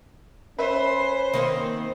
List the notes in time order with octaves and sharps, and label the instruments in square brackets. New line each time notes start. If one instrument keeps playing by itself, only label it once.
[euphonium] C#4 [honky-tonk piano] B4 E5 [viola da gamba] C5
[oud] D#3 A#3 C4